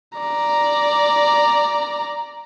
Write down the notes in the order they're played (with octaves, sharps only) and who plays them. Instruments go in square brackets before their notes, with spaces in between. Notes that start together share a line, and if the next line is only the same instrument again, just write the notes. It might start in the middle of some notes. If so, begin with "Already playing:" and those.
[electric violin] D5 A#5